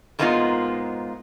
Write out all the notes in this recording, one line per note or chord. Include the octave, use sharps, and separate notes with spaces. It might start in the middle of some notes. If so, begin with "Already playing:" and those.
G#2 G#3 A#3 B3 D#4 F4